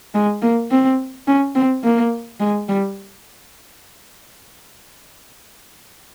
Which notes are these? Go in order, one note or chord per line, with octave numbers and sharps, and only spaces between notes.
G#3
A#3
C4
C#4
C4
A#3
G#3
G3